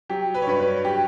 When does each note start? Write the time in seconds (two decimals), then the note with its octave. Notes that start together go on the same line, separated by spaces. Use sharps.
0.09 F#3 G4
0.34 B4
0.42 C#5
0.47 G2 B4
0.60 B4
0.85 G4